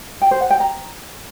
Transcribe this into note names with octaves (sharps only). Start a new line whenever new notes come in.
G5
C5
F#5
G5
A#5